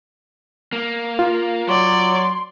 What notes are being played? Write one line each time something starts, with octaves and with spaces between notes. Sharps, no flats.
A#3
F4
F#3 C#5 D5 C6